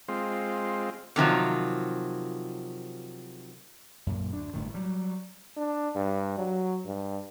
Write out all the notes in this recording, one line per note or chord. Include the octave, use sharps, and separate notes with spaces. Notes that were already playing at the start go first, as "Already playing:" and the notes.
G#3 C4 F4
C3 D#3 F3 F#3
F#2 A#2
D2 D4
G1 A2 D#3
F#3 G3
D4
G2
F#3
G2